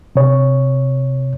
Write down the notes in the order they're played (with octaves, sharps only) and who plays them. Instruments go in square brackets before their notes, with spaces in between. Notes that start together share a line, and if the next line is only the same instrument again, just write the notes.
[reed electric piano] C3 C#5